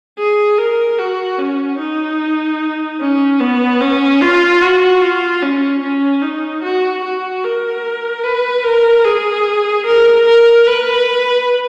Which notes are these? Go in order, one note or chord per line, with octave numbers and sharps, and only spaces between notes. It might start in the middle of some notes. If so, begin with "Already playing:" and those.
G#4
A#4
F#4
C#4
D#4
C#4
B3
C#4
F4
F#4
F4
C#4
C#4
D#4
F#4
F#4
A#4
B4
A#4
G#4
A#4
A#4
B4